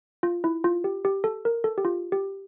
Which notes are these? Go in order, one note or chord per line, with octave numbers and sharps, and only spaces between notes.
F4
E4
F4
G4
G4
A4
A#4
A4
G4
F4
G4